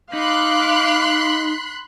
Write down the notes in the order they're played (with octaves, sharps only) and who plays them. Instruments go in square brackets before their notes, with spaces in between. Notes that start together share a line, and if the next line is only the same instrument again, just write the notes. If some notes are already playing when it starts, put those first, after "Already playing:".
[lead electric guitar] D#4 [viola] F5 D6 [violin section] B5 C6 F#6